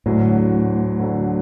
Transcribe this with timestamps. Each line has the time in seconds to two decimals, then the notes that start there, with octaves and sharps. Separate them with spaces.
0.06 D2 A2 D3 F#3
1.00 D2 D3 F#3